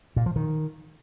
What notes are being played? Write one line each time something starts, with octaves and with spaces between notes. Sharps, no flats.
A#2
F3
D#3